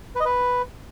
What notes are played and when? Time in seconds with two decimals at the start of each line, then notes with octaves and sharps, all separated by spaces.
0.15 B4
0.20 D#5
0.25 B4